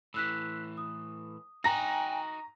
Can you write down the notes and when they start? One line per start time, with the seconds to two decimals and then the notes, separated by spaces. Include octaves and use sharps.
0.14 A2 E3 E6 F#6 B6
0.77 D#6
1.64 D#4 F#4 G5 G#5 A#5 A#6